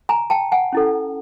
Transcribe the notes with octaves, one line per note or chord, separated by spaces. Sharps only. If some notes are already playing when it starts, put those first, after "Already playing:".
G#5 A#5
G5 A5
F#5 G#5
C#4 E4 A4